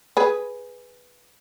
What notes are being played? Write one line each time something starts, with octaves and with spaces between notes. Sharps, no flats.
G#4 B4